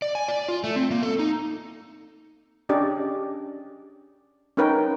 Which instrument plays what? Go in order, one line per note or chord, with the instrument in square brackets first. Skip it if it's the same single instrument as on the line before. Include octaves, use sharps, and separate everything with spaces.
[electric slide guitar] D5
G#5
D5
F4
A3
C4
A#3
A4
D#4
[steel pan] C#4 D4 G4 D5 D#5
C#4 D#4 A#4 B4 C#5 G5